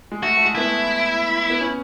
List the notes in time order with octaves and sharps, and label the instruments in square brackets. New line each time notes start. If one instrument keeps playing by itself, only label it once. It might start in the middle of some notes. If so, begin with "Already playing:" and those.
[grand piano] G#3
[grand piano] A3 [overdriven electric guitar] F#4
[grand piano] A3
G#3
[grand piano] B3 [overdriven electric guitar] E4
[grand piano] A3
B3
C#4